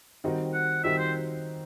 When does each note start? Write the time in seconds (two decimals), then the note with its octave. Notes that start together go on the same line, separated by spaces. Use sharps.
0.24 D#3 G3 C4 D#4 F#4
0.54 F#5
0.84 D#3 G3 C4 D#4 F#4 E5
0.98 C5